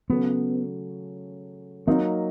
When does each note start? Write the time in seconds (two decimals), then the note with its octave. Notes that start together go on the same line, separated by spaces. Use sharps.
0.10 C#3 F#3 A3 B3 C#4
1.87 F#3 A#3 C4 D#4